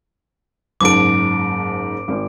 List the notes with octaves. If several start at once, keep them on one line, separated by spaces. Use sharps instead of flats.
F#1 G#2 A5 D6 D7
G#1